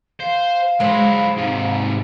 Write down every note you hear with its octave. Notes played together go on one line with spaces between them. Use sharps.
C5 F5
F#3 G#3 E4 C5
G#2 C3